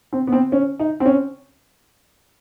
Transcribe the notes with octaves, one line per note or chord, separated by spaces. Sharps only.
C4
B3
C4
C#4
D#4
C4
C#4